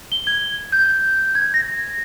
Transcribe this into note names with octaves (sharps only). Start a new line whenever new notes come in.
G7
G#6
G6
G#6
A#6